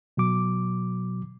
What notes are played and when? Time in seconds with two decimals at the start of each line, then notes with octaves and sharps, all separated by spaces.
0.17 B2 F#3 D6